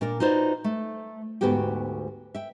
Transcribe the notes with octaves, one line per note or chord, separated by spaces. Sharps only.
A#2 D4 A#4 D5
D#4 F4 F#4 B4 C5 D5
A3
D2 G#2 B3 F#4 G4 G5
E5 G5